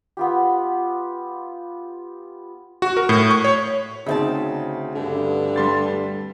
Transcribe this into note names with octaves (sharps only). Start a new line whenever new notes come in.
B3 F4 G4
F#4
A#4
A2
C#6
C#5
D2 C#3 C4 D#4 A5
G2 D3
G3 C6 A6